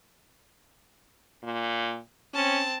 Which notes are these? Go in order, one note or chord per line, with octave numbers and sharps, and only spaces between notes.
A#2
C4 C#4 A5